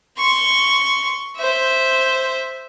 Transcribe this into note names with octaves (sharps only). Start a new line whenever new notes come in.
C6 C#6
C5 E5